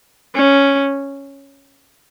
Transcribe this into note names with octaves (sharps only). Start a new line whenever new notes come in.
C#4